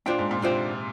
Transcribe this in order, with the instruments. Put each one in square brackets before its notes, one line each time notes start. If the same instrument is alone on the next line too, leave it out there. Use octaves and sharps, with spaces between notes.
[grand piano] A#2 [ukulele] D4 F4 C5 G5
[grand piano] G#2
A#2
[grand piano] C3 [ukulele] D4 F4 C5 G5